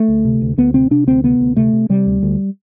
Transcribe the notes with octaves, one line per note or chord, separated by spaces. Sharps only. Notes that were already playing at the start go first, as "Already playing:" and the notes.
Already playing: A3
D2
C3
D2
D2 B3
C3 C4
C3 D4
D2 C4
C3 B3
D2
C3 A3
C3
C3 G3
D2
D2